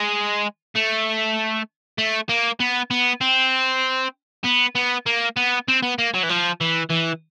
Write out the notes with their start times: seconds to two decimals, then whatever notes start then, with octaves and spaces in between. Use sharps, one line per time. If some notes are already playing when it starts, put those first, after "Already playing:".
Already playing: G#3
0.75 A3
1.98 A3
2.29 A#3
2.60 B3
2.91 B3
3.21 C4
4.45 B3
4.75 B3
5.06 A#3
5.37 B3
5.68 C4
5.82 B3
5.98 A#3
6.14 F#3
6.23 E3
6.29 F3
6.61 E3
6.90 E3